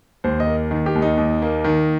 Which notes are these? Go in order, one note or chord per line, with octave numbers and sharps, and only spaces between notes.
D#2 C5
D#5
A#3
D#3
G4
D#2
D#4
D#2
A#3
D#3